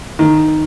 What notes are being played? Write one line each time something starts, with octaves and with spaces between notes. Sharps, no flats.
D#3